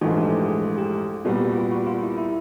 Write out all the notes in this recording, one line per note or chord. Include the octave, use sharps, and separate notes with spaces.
A#1 G#2 E3 A3 F#4
G4
G4
G#4
A4
G4
C2 A#2 G3 B3 F#4
F4
F#4
F4
E4
E4